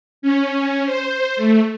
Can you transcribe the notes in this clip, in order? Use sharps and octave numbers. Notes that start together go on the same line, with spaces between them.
C#4
C5
A3